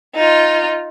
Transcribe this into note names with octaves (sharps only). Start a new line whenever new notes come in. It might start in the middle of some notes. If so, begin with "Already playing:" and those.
D#4 F4